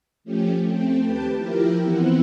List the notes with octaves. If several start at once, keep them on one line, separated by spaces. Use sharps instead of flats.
F3 A3 C#4 G4
A3 C4 G5
D#2 G4 B4 G5 A5
F3 E4 G4 A#4
E3 B3 C4 E4 F#5